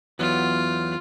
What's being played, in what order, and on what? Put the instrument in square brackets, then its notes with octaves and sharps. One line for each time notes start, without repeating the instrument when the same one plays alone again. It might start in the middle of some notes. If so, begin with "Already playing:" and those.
[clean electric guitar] E2 F#3 B3 [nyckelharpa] F4